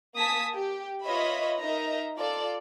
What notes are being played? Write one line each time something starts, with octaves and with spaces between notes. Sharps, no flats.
A#3 G#5 A5 D#6 B6
G4
F4 B4 C#5 D#5 E5 B5
D#4 A#4 D#5 E5 A#5
F4 A4 D5